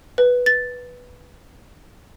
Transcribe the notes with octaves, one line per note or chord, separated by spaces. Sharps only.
B4
A6